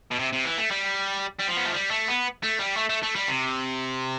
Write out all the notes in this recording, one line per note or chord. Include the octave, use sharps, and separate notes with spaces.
B2
C3
C3
E3
A3
G3
G3
F3
B3
A3
G3
A3
B3
A3
G3
A3
A3
A3
G3
C3